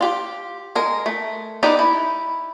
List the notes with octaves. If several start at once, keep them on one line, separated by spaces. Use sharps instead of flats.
F4 G4
G#3 A#4
A3
B3 D#4 G4 D5
E4